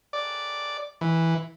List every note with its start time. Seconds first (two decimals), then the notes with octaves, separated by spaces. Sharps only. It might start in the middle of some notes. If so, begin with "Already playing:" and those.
0.13 D5
1.01 E3